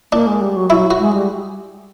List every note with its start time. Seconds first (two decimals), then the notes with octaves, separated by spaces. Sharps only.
0.12 A#3 D4
0.27 G#3
0.41 G3
0.56 F#3
0.70 F#3 E4
0.91 F#4
0.99 G#3
1.14 G3